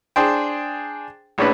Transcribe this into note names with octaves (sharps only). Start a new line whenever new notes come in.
D4 G#4 C5 G5
A#1 A2 C#4 D4 B4